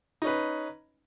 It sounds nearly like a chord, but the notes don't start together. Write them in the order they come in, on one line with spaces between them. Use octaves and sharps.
D#4 C#4 B4